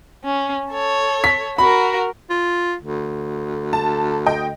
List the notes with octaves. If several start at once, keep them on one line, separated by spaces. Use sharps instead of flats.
C#4
A4 C#5
B6
F#4 A#4 B5
F4
D2
A5
D#5 G5